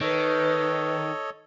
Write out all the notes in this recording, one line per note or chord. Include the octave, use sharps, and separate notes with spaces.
D#3 A4 B4 C#5 D#5